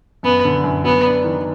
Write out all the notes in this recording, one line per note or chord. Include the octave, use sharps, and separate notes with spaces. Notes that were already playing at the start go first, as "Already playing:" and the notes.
F#2 B3
D3
F#2
F#3 B3
D4
D#3